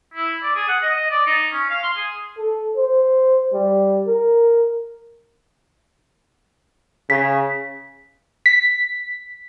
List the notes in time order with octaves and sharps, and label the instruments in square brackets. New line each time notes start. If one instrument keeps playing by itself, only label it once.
[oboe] E4
D5
G#4
F#5
D#5
D#5
D5
D#4
C#4
F5
C6
G#4
[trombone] A4
C5
G3
A#4
[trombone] C#3 [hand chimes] B6
[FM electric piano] B6